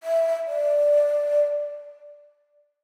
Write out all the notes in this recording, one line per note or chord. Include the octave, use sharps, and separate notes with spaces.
E5
D5